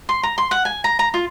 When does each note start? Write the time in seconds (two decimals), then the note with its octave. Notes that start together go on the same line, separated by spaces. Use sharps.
0.09 C6
0.23 A#5
0.38 C6
0.51 F#5
0.65 G#5
0.84 A#5
0.99 A#5
1.14 F4